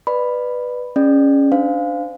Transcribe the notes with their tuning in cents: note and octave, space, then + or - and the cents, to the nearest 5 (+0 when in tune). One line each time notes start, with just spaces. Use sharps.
B4 +0 D5 +30 B5 +0
C#4 +0 G#4 +0 D5 +30
D4 +5 C5 -35 F5 +0